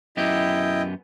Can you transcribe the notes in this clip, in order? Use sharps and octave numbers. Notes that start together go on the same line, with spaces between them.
F#2 B3 E4 G4 D#5 G5